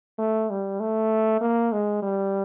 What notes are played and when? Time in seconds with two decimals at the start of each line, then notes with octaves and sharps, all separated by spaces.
0.19 A3
0.50 G3
0.80 A3
1.41 A#3
1.72 G#3
2.02 G3